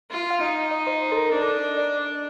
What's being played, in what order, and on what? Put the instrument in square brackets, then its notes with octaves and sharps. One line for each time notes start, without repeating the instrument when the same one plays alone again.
[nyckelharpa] F4
[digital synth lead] F5
[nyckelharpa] D#4 [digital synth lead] D#5
[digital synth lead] D#5
C5
C5
A4
A#4
[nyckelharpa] D4 [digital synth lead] A4
[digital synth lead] A#4
D#5
D#5
D5